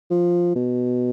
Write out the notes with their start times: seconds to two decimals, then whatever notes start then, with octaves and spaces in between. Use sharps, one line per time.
0.10 F3
0.55 B2